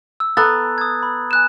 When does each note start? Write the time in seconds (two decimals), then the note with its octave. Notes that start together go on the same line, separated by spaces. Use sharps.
0.20 E6
0.37 B3 A4 A#5 F#6 A6
0.78 D#6 G#6
1.03 B5
1.31 G#5 F#6 E7